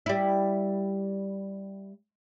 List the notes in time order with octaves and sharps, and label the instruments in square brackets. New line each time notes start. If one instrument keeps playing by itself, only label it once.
[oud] G3 E4